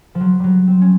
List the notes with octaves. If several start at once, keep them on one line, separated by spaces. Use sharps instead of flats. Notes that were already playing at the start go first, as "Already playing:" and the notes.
F3
F#3
F#3 G3
C4
C#4